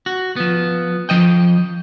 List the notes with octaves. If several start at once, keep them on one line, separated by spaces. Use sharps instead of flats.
F#4
F3 B3
F3 D#5 G5